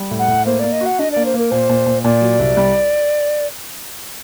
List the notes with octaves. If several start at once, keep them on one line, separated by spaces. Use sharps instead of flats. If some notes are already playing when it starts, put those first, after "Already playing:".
Already playing: G3
A2
F#5
A2
A#3 C5
A#3 D5
D#5
F#4
F#5
D4 D#5
A#3 D5
C5
A#3 A#4
A#2 C5
A#2
A#2
A#2 D5
F#3
C2
G3